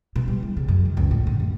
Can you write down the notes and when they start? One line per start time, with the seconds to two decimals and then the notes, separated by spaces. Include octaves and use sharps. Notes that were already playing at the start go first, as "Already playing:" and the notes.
0.16 B2
0.28 G3
0.43 E2
0.57 C#3
0.68 F#2
0.85 D#3
0.97 C#2
1.11 A2
1.27 D3
1.40 F#2